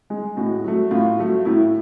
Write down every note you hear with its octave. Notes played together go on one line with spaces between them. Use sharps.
G#3
A2 F#4
F#3 A3
A2 F4
F#3 A3
A2 E4